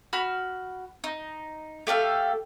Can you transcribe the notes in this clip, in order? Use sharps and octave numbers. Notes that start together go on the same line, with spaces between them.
F#4 B5 F6
D#4
A3 G4 A4 F5